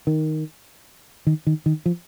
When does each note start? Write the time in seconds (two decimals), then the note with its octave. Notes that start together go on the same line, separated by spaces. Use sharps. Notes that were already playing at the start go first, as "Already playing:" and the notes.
0.07 D#3
1.27 D#3
1.47 D#3
1.66 D#3
1.86 F3